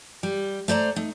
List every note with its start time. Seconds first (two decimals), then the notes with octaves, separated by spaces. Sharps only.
0.23 G3
0.68 A3 C5 D5 A#5
0.96 A3 D#4